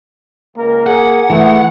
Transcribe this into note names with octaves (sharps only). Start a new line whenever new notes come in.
C#2 A#3 A#4
G#4 F#5
E3 A3